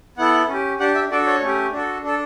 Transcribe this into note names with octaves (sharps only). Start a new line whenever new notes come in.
B3 E4 A4 F#5
C#4 G4
D4 G4 F#5
E5
D4 F#4 A4 D5
C#5
A3 C#4 G4
D4 F#4 A4
D4 A4